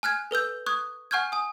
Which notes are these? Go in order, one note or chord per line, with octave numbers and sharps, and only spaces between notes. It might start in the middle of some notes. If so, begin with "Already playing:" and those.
G#5 F6 F#6 G#6
A4 B4 E6 G6
C#6 D#6 F#6 G#6
F#5 G#5 C#6 F6 G6 G#6
G#5 D#6